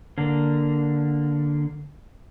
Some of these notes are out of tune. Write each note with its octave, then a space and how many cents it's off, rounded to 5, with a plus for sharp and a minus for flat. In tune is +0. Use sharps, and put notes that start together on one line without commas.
D3 +0 A#3 +0